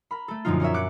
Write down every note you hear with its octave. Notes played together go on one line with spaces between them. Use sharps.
A#4 B5
A3 A4
F#2 A#2 D3 F3 D#4 F4
C#4 A#4 C#5 E5
D6 F#6 C#7